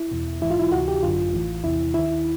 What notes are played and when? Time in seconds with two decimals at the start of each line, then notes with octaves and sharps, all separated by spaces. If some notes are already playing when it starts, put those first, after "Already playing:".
Already playing: E4
0.11 E2 B2
0.42 A#1 G#2 E3 E4
0.51 F4
0.59 E4
0.72 D2 C3 E3 F#4
0.88 G4
1.02 G#1 F#2 D3 F4
1.33 A1 A2 E3
1.64 E2 C3 E3 E4
1.94 D#2 D#3 E4